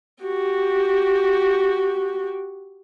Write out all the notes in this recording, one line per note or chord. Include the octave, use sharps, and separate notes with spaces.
F#4 G4